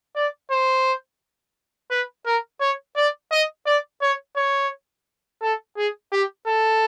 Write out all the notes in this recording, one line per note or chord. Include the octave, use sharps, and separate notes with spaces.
D5
C5
B4
A#4
C#5
D5
D#5
D5
C#5
C#5
A4
G#4
G4
A4